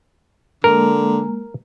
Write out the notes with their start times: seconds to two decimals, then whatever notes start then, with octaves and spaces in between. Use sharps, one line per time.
0.64 D3 G#3 A#3 A#4 A#5